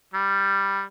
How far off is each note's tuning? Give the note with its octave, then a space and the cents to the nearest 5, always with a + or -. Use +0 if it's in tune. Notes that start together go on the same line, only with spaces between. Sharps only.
G3 +5